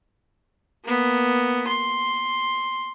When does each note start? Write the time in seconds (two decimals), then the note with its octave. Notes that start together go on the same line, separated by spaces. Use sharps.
0.84 A#3 B3
1.67 C6